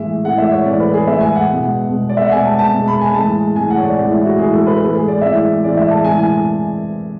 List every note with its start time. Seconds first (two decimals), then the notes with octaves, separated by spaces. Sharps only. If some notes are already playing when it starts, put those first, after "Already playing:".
Already playing: A2 E3 G#3 E5
0.25 A2 E3 G#3 F#5
0.38 E5
0.51 C#5
0.66 A2 E3 G#3 D5
0.80 B4
0.94 G#4
1.07 A2 E3 G#3 E5
1.21 G#5
1.35 F#5
1.49 B2 G#3
1.90 B2 G#3
2.09 D5
2.17 E5
2.24 F#5
2.32 B2 G#3 G#5
2.46 A5
2.59 A5
2.73 B2 G#3
2.88 B5
3.01 G#5
3.14 A2 E3 G#3 A5
3.56 A2 E3 G#3 G#5
3.70 F#5
3.78 C#5
3.83 D5
3.98 A2 E3 G#3
4.11 E4
4.25 F#4
4.39 A2 E3 G#3 G#4
4.53 A4
4.67 B4
4.81 A2 E3 G#3 A4
4.95 G#4
5.08 D5
5.21 A2 E3 G#3 E5
5.63 A2 E3 G#3 D5
5.77 E5
5.91 A5
6.04 A2 E3 G#3 G#5
6.19 G#5